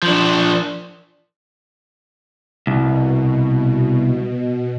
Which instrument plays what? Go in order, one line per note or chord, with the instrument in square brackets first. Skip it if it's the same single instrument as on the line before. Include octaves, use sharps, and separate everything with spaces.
[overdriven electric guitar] F3 D4
[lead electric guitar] C2 [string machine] B2